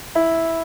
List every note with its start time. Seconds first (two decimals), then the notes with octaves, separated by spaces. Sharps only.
0.15 E4